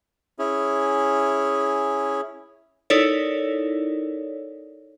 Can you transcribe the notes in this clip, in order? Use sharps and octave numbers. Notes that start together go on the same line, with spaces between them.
C#4 E4 G#4
D#4 E4 A4 A#4 C#5 D5